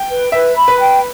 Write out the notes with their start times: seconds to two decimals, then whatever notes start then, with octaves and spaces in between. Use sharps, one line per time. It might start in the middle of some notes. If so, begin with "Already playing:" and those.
Already playing: G5
0.09 B4
0.32 B4 E5
0.56 B5
0.68 B4
0.79 G5